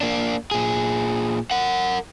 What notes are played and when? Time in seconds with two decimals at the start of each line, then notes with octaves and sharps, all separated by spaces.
0.01 A#3 D4
0.51 A#2 G#4
1.51 A#4 F#5